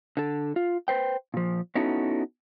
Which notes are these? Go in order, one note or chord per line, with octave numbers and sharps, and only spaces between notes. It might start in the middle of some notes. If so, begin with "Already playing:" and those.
D3 A4
F4
B4 C5 G5
A#2 F3
B3 C#4 D#4 E4 F#4 A4